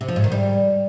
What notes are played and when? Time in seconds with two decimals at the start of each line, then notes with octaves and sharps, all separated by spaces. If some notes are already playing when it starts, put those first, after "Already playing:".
0.01 C3
0.08 F3
0.16 G#2
0.24 D#3
0.32 G3